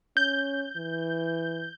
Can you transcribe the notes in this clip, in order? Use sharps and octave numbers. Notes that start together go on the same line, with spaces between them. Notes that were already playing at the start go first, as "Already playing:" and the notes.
C#4 G6
E3